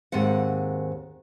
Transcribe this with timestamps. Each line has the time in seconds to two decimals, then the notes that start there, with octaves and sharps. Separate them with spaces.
0.12 D#2 G#2 C4 F#5